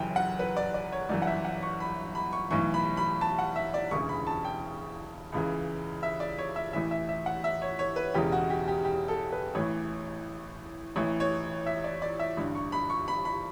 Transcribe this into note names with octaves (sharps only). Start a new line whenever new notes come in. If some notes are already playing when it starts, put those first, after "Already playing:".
Already playing: F#1 F#2 E3 G5
F#5
B4
D5
D5
C#5
G1 F#2 E3 D5
F#5
E5
F#5
C#6
B5
B5
C#6
B1 A2 E3 C#6
B5
B5
A5
F#5
E5
D5
E1 D2 C#3 E3 C#6
B5
A5
G5
C#2 C#3 E3
E5
D5
C#5
E5
A1 A2 E3 E5
E5
E5
F#5
E5
C#5
C#5
B4
E1 E2 C#3 G4
F#4
G4
G4
G4
A4
B4
A1 A2 E3 C#5
A1 A2 E3 C#5
C#5
E5
D5
D5
E5
A1 G2 D3
C#6
B5
C#6
B5
B5